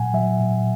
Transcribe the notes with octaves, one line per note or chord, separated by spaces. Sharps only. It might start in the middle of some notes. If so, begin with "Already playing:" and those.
Already playing: A#2 F#3 F#5 G#5
F#3 E5
A#2